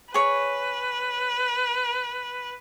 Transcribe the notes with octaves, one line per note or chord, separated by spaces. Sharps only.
G#4 B4 C#5